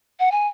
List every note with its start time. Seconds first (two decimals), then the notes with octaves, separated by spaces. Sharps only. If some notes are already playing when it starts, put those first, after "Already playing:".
0.20 F#5
0.32 G#5